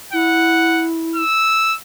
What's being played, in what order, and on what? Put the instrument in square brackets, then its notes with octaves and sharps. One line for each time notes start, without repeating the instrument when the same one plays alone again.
[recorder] E4 [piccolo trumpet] F#5
[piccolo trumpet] E6